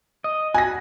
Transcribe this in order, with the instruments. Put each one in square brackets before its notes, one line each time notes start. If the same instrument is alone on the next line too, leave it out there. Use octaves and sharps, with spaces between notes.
[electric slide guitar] D#5
[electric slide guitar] F#4 [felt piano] G#5 A#6